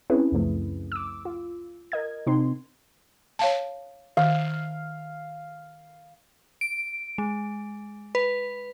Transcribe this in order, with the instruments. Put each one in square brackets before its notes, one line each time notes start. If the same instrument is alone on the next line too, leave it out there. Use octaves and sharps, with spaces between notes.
[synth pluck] C4 C#4 E4 G#4 B4
C#2 F#2 C#3 F3 A3
D6 E6
F4
A#4 D#5 G#6
C3 C4 D#4 C6
[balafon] C#5 F5 A5
[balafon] D#3 [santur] F5
[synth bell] D7
G#3
B4